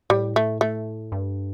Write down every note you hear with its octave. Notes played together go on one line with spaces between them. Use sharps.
A2 G3
A3
A3
G2